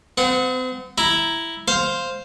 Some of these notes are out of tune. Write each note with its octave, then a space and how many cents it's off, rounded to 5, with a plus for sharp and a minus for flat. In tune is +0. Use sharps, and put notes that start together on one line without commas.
C4 -40 F#5 -25
E4 +0 A#5 +5
C5 +0 F5 +0